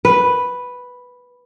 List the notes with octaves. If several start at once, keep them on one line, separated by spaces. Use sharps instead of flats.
B4